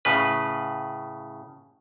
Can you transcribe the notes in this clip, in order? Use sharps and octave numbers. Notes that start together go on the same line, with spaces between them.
A2 C#3 B4